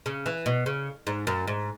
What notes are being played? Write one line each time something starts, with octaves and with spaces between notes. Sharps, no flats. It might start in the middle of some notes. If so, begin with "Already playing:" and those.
C#3
E3
B2
C#3
G#2
F#2
G#2